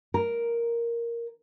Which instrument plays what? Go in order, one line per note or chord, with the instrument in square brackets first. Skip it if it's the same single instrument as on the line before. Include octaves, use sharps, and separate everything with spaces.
[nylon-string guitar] A#4